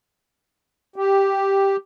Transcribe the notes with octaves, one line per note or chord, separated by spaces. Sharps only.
G4